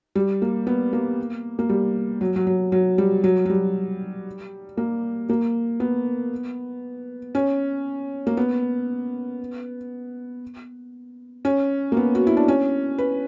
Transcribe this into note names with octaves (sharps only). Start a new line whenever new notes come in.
G3
A#3
B3
A#3
A#3
G3
F#3
F#3
F#3
F#3
G3
F#3
F#3
G3
A#3
A#3
B3
C#4
A#3
B3
C#4
A#3
B3
F#4
E4
D4
C#4
B4